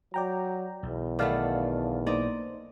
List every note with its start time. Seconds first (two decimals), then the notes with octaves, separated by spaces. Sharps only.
0.14 F#3 D5 G5 A#5
0.83 B1 E2
1.19 D#3 A3 B3 D5 F5 A5
2.07 A#3 D#4 C5 D5 D#5